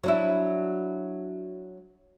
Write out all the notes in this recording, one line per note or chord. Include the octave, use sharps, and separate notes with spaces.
F#3 D4 E4